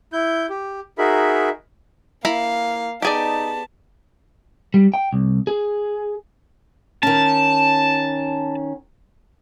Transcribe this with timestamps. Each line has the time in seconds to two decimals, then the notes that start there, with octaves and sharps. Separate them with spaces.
0.13 E4 G6
0.49 G4
0.98 D#4 F#4 G#4 A#4 E5 B5
2.25 A#3 E4 F5 A#5 B5
3.02 B3 D#4 G4 G#4 D5 A5
4.74 G3
4.94 G5
5.13 C2
5.47 G#4
7.03 D#3 C#4 A5